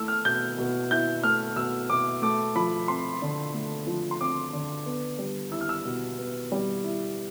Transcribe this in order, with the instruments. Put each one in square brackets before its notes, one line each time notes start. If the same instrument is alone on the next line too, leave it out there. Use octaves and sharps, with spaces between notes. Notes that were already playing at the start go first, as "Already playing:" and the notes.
Already playing: [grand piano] A3 E4 E6
F6
B2 G6
B2
E4 G6
A3 F6
B2 E6
B2 D6
A3 D6
F3 B5
C4 C6
D3
A3
F3
C6
C4 D6
D3
B3
G3
E4 E6
F6
E6
B2
B3
G3
E4